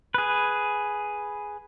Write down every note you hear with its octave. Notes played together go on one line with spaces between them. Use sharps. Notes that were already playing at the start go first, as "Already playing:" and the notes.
G#4 B4